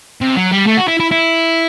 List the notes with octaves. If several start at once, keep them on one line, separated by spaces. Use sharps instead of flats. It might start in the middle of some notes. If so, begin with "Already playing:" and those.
C3
F#3
G3
A3
F#4
E4
E4
E4